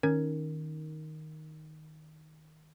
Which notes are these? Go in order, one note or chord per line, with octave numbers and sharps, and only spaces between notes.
D#3 C#4 A#4 G#6